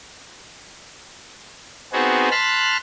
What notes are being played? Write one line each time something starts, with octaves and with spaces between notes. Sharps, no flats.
B3 C4 D#4 F#4 G#4
A5 B5 C6 F6 F#6